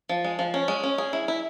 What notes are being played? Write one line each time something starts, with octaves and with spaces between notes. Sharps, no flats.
F3
G#3
F3
C#4
G#3
C#4
G#4
E4
E4